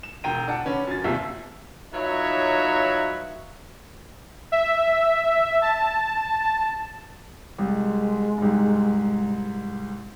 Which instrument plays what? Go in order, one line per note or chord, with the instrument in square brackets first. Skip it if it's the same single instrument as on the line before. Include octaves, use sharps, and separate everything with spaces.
[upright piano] E7
E1 D3 G5 A#5 D#7
D4 F#5 A5
D3 C#4 B4
F#2 A6
G1 D#2 C3 E5
[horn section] F#3 D#4 F4 B4 C#5 E5
[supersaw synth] E5
A5
[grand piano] C2 [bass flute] G#3
[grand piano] C2 G#2